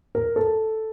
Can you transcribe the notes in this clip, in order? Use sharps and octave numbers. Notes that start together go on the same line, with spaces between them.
A#4
A4